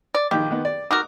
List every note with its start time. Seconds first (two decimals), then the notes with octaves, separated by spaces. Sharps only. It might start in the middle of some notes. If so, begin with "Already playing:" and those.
0.15 D5
0.31 A#1 D#3 G4
0.51 D#3 B3
0.65 D5
0.91 D#4 F#4 A#4 D6